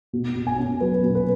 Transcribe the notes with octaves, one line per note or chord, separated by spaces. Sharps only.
B2
B2
G#5
C#4
F#3 B4
B2
B4